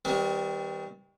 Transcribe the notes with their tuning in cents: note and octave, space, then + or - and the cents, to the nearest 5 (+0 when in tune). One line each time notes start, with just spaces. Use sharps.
D#3 +35 G3 +0 C4 -40